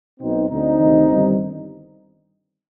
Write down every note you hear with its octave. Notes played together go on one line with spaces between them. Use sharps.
B1 B2 C4 D#4
D2 D3 C4 D#4
D2 C3 D#3
G1 G2 D#3